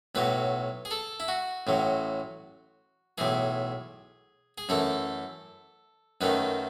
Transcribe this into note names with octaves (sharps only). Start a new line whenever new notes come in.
B1 A2 F#3 B4
G#4
A4
E4
F#4
A1 A2 F#3
B1 A2 E3 G#4
G#4
F#2 E3 A3 A4
F#2 D#3 A3 B4